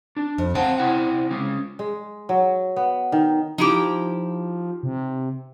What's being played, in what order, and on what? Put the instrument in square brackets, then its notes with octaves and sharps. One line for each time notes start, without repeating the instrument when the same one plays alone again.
[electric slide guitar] D4
[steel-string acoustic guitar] F2
[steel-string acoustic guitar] C4 [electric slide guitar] F5 F#5 A5
[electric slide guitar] C3 E4 F#5
G#3 C#4
[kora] G#3
F#3
B3
D#3
[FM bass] F3 [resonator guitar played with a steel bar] D#4 E4 G4
[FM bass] C3